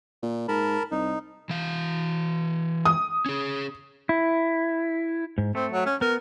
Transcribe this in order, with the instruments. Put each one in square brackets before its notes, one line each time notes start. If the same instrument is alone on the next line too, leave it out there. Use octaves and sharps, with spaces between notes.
[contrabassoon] A#2
[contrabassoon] G#2 [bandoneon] A#4 A5 B5
[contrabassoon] C2 [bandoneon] D#4
[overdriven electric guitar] E3 F5
[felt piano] D#6
[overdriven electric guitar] C#4 G#4
[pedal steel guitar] E4
[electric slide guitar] G#2
[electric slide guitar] A3 [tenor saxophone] C4
[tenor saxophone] F#3
C#4
[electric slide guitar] B3 [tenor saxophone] A#4